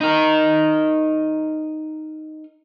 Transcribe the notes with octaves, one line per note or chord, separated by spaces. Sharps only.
D#4 A#4